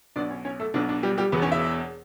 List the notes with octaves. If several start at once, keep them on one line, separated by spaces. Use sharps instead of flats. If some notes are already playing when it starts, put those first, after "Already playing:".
B1 B2 D4 D5
C#4 C#5
C#4 C#5
A3 A4
B1 B2 D4
D4
G3 G4
G3 G4
E1 E2 B2 B3 B4
C#4 C#5
E4 E5